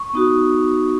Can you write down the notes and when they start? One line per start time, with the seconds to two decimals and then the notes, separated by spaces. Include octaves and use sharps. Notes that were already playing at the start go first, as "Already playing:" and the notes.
Already playing: C#6
0.13 B3 D#4 F#4